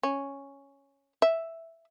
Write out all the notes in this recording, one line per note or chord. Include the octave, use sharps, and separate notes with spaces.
C#4
E5